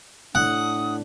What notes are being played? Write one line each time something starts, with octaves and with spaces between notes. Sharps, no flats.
A2 D4 F#5 D#6